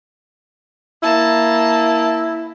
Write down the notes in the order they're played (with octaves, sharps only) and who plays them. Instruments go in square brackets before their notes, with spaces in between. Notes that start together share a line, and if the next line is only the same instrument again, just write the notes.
[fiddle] A#3 A5 [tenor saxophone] E4